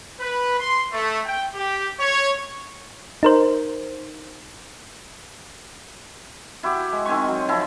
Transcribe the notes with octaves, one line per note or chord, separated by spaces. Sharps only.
B4
C6
A3
G5
G4
C#5
D#4 A#4 C5
E4 F#4 G4
G#3
D#3 C4 G#5 C#6
F#3
F3 C4 E4